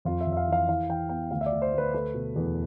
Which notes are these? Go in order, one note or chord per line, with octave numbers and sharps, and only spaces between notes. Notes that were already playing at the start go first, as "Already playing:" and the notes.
F2 F4
E5
F2
E5
F5
E3 F5
E3 F5
E3 G5
B3 G5
D2 F5
E5
D5
D2
C5
D2 B4
A3 B4
B2
E2